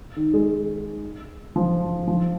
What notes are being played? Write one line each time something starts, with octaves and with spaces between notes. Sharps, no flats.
D#3
G#3
F3
F3